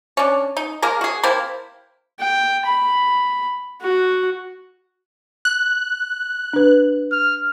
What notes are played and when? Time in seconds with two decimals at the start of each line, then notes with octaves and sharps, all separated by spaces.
0.17 C#4 D4
0.57 D#4
0.82 G#3 A#3 A#4
1.01 F#4 G#4
1.23 C3 A#3 C4 E4
2.20 G5
2.66 B5
3.82 F#4
5.45 F#6
6.53 D4 B4
7.12 F6